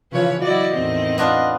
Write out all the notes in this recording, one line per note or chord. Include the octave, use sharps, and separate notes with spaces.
C#3 E3 F3 B4 C#5
F#3 E4 F#4 D5 D#5
E2 A2 D#3 C4
B3 D4 F4 D#5